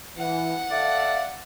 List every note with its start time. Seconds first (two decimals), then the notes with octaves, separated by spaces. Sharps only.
0.18 E3 F#5
0.71 A4 D5 E5 F5